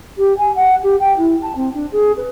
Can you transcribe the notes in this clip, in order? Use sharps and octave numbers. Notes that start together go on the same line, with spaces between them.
G4
G#5
F#5
G4
G5
E4
A5
C4
D4
G#4
B4